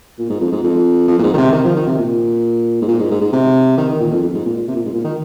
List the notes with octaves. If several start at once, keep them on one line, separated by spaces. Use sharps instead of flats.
A#2
G#2
F2
G#2
F2
F2
A#2
G#2
D#3
C3
D#3
F3
D#3
C3
A#2
G#2
A#2
G#2
G#2
G#2
C3
D#3
D#3
A#2
F2
F2
G#2
A#2
A#2
C3
A#2
G#2
A#2
D#3